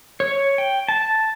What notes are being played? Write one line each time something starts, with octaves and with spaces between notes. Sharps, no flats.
C#5
G5
A5